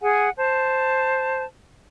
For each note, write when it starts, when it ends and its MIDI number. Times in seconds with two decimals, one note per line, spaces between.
0.01 0.29 68
0.01 0.29 78
0.01 0.29 80
0.37 1.43 72
0.37 1.43 81